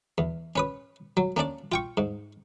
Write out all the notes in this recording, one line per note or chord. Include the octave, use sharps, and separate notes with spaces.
E2
C#4 B4 D#6
F#3
A#3 C#4 D4 D5
F4 G5 C#6
G#2